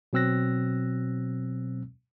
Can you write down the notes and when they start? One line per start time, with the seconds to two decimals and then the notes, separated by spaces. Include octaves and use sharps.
0.13 B2 F#3 C4 E6 F#6 A#6